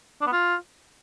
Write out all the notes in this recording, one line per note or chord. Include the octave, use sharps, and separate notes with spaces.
D4
B3
F4